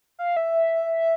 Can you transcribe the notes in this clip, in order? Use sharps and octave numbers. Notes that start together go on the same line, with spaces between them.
F5
E5